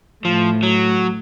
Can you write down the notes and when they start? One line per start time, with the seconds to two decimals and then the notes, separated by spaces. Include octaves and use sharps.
0.25 A2 F3
0.63 F#3